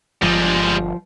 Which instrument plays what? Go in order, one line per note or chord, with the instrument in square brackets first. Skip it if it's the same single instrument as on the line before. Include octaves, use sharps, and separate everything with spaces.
[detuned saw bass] G1 [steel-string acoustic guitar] F3 [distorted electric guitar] G3 G#3